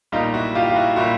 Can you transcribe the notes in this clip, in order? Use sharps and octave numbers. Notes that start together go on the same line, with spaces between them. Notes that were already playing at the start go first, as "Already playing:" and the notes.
B1 A#2 G3 D#4 F4
E4 F#4
F4 G4
F4
E4 F#4
A#2 G3 E4 F#4